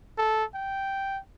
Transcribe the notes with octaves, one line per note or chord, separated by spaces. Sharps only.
A4
G5